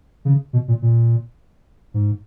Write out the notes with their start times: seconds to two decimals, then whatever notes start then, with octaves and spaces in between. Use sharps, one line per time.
0.25 C#3
0.53 B2
0.68 A#2
0.82 A#2
1.94 G#2